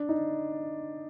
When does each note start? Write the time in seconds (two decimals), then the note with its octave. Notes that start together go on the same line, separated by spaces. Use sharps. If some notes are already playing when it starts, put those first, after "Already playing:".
Already playing: D4
0.09 D#4